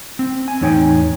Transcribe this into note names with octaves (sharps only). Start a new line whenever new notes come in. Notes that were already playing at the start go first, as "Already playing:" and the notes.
C4
G#5
E2 A2 D#4 C#5 G5 G#5